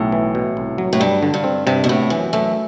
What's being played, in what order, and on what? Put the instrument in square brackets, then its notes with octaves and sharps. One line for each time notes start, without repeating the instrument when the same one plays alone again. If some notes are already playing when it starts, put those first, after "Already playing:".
Already playing: [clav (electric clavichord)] B1 [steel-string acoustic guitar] A2
[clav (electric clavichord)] E3
B2
C2
F#3
[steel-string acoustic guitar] A2
[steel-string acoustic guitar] G2 [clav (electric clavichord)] G3
[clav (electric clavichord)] D3
[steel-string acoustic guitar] G2
[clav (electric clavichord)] C4
[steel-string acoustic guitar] G2 [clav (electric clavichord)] C3
[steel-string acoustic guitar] B2
[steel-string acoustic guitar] A2 [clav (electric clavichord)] B3
[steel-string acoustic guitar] F#2 [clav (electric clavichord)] E3
[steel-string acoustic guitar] F#2 [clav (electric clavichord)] A3